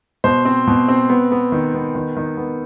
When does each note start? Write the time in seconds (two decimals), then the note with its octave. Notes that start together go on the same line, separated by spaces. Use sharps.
0.24 B2 C5
0.45 C4
0.67 B2
0.88 C4
1.09 B3
1.31 B3
1.52 D#3
1.74 B3
1.95 D#3
2.17 D#3
2.37 B3